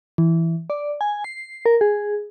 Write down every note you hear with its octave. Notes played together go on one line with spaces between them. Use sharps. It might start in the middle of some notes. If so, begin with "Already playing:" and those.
E3
D5
G#5
C7
A#4
G#4